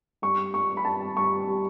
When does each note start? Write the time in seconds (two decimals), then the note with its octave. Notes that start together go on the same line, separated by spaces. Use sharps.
0.22 G2 C#6
0.54 G2 C#6
0.77 B5
0.85 G2 A5
1.16 G2 C#6
1.48 G3